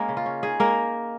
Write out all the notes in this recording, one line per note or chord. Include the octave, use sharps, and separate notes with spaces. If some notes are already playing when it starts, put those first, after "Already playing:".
Already playing: G#3 A#3 C#4 A#4
C#3
F4
C#4
D#4 G#4
G#3 A#3 A#4